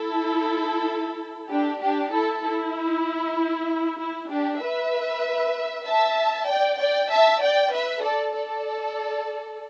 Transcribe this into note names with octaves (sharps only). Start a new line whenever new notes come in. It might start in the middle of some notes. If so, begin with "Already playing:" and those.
Already playing: E4 A4
D4 G4
D4 G4
E4 A4
E4
E4
D4 G4
B4 E5
E5 A5
D5 G5
D5 G5
E5 A5
D5 G5
B4 E5
A4 D5
A4 D5